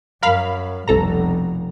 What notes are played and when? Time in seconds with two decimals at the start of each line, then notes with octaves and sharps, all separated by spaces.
0.22 F#2 A#4 F5 B5
0.88 F1 C2 B2 A4 A#5